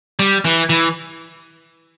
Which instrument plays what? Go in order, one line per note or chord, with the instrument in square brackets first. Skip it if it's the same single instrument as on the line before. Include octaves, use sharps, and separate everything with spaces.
[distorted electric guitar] G3
E3
E3